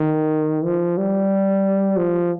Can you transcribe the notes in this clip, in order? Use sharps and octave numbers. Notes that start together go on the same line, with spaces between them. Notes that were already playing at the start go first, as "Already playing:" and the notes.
Already playing: D#3
F3
G3
F3